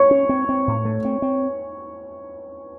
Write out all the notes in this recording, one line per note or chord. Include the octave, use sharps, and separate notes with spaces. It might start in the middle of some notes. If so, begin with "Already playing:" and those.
Already playing: C#5 C#6
C#4
C4
C4
A2
A3
C4
C4